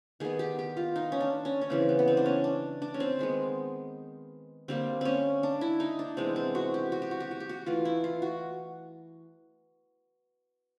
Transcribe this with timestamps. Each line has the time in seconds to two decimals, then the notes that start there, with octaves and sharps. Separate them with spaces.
0.20 D#3 G3 B3 G#4
0.39 G4
0.59 G4
0.77 F4
0.96 D#4
1.12 C#4
1.20 D4
1.45 C#4
1.61 C#4
1.70 C#3 E3 G3 C4
1.89 B3
1.99 B3
2.08 C4
2.17 D4
2.26 C#4
2.44 D4
2.82 D4
2.94 C#4
3.00 C4
3.19 D#3 G#3 B3
4.68 D3 G3 A#3 C4
5.01 C4 C#4
5.43 D4
5.61 E4
5.80 D#4
5.99 D4
6.17 C3 E3 G#3 B3 C4
6.36 C4
6.55 F#4
6.74 G4
6.92 F#4
7.02 G4
7.11 F#4
7.20 G4
7.31 F#4
7.40 G4
7.49 F#4
7.66 E3 A3 F4
7.85 E4
8.04 F4
8.22 F#4